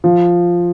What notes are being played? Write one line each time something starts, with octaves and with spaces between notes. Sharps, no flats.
F3